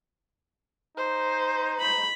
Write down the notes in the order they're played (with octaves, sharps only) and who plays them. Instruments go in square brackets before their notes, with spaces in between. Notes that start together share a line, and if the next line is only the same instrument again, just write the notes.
[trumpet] D#4 [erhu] C5
[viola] B5